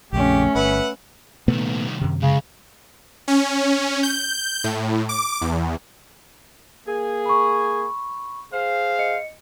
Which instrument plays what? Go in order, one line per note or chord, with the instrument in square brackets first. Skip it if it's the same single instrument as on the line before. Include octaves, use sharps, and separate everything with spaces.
[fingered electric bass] A#1 F2 C#3 [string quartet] A3 C#4 [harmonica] G4
[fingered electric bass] G1 [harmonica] B4 E5 F#5
[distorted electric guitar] C2 D#3 [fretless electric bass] A#2 A3 B3
[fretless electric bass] F#2 C3
[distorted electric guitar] C#2 G#3 [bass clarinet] C#3
[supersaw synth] C#4
G6
A2
D6
E2
[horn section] A#3 G#4
[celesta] B5 C#6
[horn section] G#4 C5 F5
[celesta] D#5 C#7